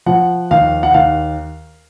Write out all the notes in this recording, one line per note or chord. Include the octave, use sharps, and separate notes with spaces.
F3 F#5
D#2 F5
F#5
D#2 F5